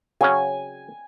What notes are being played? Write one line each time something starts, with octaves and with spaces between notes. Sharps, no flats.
C#3 F#3 C#4 G#5